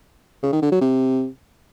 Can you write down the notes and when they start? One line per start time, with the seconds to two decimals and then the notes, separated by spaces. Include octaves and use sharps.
0.43 C#3
0.53 D#3
0.62 D3
0.72 F#3
0.81 C3